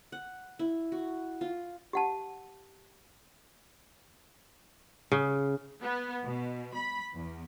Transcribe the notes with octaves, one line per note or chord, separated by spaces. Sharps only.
F#5
E4
F#4
F4
G4 F#5 A5
C#3
B3
B2
B5
E2